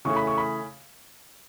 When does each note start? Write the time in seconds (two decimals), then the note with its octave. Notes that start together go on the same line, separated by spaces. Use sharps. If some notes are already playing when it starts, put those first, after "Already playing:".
0.05 C#3 E3 A3 C#6
0.16 B5
0.27 C#6
0.38 B5